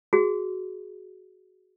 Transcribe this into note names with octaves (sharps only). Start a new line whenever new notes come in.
F#4 G#4